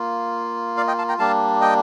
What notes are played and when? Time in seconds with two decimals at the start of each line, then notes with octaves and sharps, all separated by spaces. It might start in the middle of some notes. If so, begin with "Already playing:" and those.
Already playing: A#3 F4
0.77 D5 F5
0.87 D#5 G5
0.98 F5 A5
1.08 G5 A#5
1.19 G3 A#3 D4 F5 A5
1.61 D#5 G5